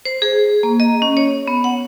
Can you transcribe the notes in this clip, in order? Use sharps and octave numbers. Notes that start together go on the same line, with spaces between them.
C5
G#4
A#3
D#5
C#4
C#5
B3
F#5